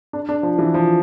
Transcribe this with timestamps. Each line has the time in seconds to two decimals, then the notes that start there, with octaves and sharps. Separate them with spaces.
0.13 D4
0.29 D4
0.43 F3
0.59 E3
0.74 F3